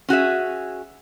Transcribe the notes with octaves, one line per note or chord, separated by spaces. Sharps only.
C#4 F#4 G#4 E5